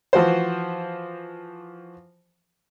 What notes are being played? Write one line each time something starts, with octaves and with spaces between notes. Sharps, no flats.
E3 F3 F#4 C5